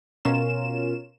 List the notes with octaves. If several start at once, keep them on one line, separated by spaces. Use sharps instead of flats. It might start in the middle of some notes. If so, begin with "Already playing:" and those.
B2 C#4 F4 A#4 E7